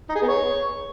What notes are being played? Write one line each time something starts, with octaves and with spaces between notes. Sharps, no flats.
D#4
G#4
B3
C#5